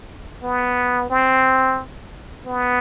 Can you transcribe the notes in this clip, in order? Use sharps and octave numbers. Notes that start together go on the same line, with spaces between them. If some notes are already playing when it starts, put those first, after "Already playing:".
B3
C4
B3